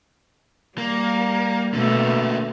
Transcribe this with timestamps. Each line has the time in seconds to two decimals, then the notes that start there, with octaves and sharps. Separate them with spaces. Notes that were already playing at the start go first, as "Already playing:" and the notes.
0.78 G3 A#3
1.74 B2 D3 A3 A#3